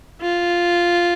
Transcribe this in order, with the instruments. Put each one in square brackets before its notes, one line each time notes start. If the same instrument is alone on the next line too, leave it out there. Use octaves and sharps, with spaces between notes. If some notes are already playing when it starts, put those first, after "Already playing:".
[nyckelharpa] F4